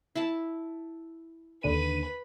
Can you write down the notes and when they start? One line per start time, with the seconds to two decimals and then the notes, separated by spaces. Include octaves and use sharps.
0.15 E4 A5
1.63 D#2 D3 B4 D#7